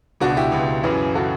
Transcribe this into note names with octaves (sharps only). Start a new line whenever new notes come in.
C#2 B2 D4 F#4
E4 G4
C#2 B2
F#2 C#3 E3
C#3 E3 F#4 A4